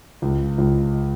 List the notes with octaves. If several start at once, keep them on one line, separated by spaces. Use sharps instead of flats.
C#2
C#2